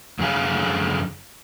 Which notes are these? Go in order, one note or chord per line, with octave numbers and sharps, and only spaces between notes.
F#2 D3 G#4 F5